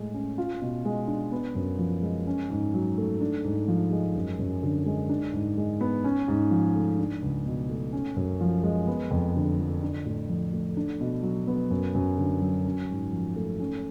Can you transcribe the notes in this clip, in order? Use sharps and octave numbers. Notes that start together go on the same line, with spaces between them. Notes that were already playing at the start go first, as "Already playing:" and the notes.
Already playing: A2 G#3
C#4
F4
B2
G#3
D4
B3
F#2
F3
G#3
C#4
G#2
F#3
A3
D4
G#2
F3
G#3
F#2
F#2
D3
G#3
D4
G#2
G#3
B3
C#4
G#2
F3
A3
D4
C#2
B2
A3
C#4
F#2
F3
G#3
B3
F2
D3
F3
D4
A2
F3
A3
D4
B2
F#3
B3
F#2
F#2
D3
F#3
C#4
G#2
F3
A3
C#4